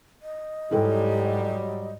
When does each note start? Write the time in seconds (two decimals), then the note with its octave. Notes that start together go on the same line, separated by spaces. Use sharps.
0.23 D#5
0.71 G#2 F#3 G3 E4 A4 G5